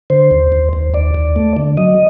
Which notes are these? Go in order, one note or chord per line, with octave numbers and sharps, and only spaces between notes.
D3 C5
D#2
D#2
D#2
D#2 D5
D#2
A3
D3
F#3 D#5